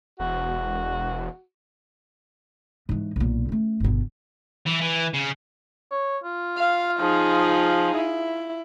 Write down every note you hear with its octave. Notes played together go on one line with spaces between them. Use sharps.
E1 F#4
G#2 E3
B1 A#2
A3 C#4
G1 B2
E3
E3
C#3
C#5
F4
F5
F3 D#4 G#4
E4